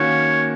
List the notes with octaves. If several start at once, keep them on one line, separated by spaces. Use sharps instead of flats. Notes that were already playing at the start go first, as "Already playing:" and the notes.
Already playing: D#3 A#3 C#4 F#4 A#4 C#5